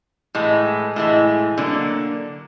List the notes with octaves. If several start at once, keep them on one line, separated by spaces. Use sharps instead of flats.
A2 E3 G#3
A2 E3 G#3
D3 F#3 A#3